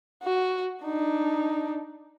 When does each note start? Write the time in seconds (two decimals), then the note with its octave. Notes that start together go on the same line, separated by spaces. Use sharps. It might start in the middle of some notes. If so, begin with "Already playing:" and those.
0.23 F#4
0.84 D4 D#4